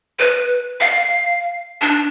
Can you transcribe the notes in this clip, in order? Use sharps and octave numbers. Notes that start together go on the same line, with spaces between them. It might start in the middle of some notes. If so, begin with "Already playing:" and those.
B4
F5
D4